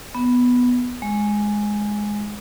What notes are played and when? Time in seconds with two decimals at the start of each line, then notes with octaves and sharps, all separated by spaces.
0.15 B3
1.02 G#3